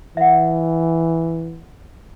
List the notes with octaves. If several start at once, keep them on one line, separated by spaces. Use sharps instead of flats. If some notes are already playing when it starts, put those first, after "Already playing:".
E3 E5 F#5